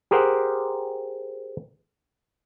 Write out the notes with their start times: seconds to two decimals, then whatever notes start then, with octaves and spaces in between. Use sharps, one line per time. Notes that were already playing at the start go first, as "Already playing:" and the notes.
0.11 G4 G#4 A#4 C5 F#5